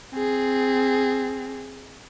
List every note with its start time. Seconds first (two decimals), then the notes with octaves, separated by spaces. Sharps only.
0.12 C4 G#4